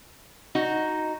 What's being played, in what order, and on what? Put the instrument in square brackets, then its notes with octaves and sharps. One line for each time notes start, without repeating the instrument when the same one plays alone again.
[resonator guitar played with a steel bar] D#4 F#4